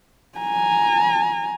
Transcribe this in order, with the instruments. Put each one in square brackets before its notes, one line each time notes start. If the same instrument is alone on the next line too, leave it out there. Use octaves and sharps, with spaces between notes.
[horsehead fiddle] G#5 A#5